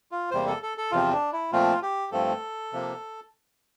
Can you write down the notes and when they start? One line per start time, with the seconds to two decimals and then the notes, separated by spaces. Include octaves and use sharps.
0.12 F4
0.31 E2 C3 G3 A#3 C5
0.47 A4
0.63 A4
0.78 A4
0.92 E2 C3 F3 C4 F4
1.13 D4
1.33 E4
1.52 A#2 F3 A3 C4 F4
1.82 G4
2.12 G2 F3 A3 C4 A4
2.73 C3 F3 A#3